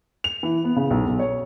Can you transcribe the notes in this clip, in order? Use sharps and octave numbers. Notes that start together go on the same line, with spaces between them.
F7
E3
B3
C#3
B1
B1
C#5